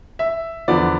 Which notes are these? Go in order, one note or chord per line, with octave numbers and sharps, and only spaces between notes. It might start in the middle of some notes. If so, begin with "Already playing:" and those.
E5
E2 D3 F3 B3 D5